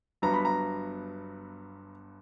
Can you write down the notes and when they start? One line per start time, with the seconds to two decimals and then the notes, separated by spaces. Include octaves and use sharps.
0.22 G1 G2 F#3 B3 A#5
0.34 B5
0.45 A#5